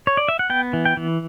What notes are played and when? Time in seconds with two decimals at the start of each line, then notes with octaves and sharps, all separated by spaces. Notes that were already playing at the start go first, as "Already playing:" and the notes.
0.07 C#5
0.17 D5
0.28 E5
0.39 F#5
0.50 B3 G5
0.73 E3
0.85 G5
0.97 E3